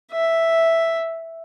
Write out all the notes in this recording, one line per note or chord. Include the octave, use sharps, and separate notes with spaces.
E5